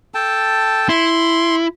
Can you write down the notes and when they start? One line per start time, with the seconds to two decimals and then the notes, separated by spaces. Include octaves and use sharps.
0.14 A4 G5 A5
0.89 E4 C6